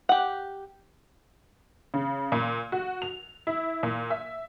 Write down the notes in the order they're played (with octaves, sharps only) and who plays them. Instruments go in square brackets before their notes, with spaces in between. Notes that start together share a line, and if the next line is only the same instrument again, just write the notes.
[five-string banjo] G4 F#5
[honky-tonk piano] C#3
A#2
F#4
F7
E4
A#2
E5